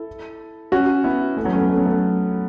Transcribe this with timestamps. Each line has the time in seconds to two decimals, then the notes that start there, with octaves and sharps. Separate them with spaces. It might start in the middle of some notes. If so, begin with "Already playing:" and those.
Already playing: E4 A4
0.72 C#4 F#4
1.04 B3 E4
1.37 A3 C#4
1.44 F#3 B3
1.53 A3 C#4
1.61 F#3 B3
1.70 A3
1.77 F#3 B3
1.86 A3